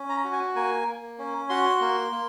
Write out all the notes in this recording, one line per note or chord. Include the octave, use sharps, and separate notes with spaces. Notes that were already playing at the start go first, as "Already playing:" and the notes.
Already playing: C#4
A#5
F#4
G#5
A#3 G#5
A#3
C#4
F#4 C6
A#3
A#3